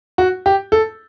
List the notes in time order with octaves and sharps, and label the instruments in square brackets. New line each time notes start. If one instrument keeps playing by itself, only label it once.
[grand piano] F#4
G4
A4